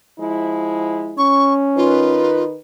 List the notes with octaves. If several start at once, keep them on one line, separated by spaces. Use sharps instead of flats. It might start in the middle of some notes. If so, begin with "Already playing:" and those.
F3 G#3 E4
C#4 C#6
D#3 D#4 F4 B4